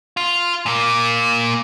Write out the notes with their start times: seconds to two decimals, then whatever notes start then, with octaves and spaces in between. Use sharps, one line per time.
0.17 F4
0.66 A#2 A#3